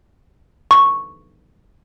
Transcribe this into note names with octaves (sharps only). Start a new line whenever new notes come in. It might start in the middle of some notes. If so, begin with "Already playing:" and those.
C#6